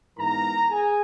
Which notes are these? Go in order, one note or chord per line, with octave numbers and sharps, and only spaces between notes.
G#2 E3 B3 A#4 A#5
G#4 G#5